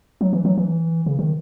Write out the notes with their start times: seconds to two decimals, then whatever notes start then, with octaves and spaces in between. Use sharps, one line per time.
0.21 F#3
0.33 E3
0.45 F#3
0.58 E3
1.06 C#3
1.19 D#3